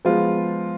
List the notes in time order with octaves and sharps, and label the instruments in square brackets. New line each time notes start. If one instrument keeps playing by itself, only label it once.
[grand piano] F3 G#3 B3 F4